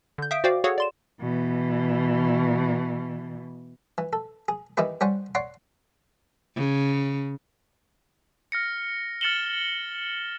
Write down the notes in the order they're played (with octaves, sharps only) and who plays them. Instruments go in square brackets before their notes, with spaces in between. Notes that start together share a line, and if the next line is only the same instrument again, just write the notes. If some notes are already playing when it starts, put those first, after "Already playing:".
[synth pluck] D3 G6
E5 F5 D#6 G6 B6 D7
F#4 C5 D5 F5 G5 D6
F#4 G#4 A4 C#5 F5 F#5
D5 C6 E7
[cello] B2 E3
[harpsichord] E3
A4
G#4
D#3 E3 D#4 E4 G4 B4
G3 C5 C#5 F#5 G#5
C#5 D5 F#5 C6 D6
[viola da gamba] C#3
[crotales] F6 A#6 C#7
F6 A6 C#7 E7 F#7 G7